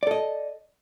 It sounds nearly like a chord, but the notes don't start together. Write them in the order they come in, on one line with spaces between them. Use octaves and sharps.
D5 A4 D#5